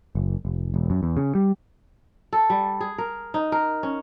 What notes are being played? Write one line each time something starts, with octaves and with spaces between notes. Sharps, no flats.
F#1
F1
E1
F#2
E2
C#3
G3
A4
G3
G#4
A#4
D#4
A#4
C#4